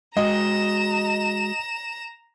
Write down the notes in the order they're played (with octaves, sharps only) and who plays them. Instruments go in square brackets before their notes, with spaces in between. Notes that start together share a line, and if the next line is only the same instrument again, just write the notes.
[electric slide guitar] G#3 F#4 [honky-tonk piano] D#5 [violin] A#5 E7